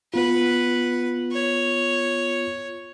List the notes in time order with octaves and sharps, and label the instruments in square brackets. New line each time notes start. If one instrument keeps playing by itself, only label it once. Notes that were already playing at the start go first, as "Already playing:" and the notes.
[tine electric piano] B3 F4 [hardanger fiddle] B4 F#5
[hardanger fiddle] C#5